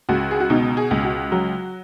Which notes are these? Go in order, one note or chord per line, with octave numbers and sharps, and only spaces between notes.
C#2 F#4
G#4
F#4
B2 D#4
G#4
C#2
F#4
F#3